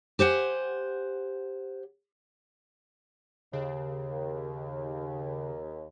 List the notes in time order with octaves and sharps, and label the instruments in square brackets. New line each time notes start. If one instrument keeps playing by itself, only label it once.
[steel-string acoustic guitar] G4 C5 F#5 G#5
[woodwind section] D#2 [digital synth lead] C#3